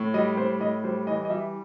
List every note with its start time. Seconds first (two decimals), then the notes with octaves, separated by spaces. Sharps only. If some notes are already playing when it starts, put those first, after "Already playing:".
Already playing: A2
0.14 G3 D#5
0.37 A2 C5
0.61 A2 D#5
0.84 G3 C5
1.07 E3 D#5
1.25 D#5
1.30 G3 E5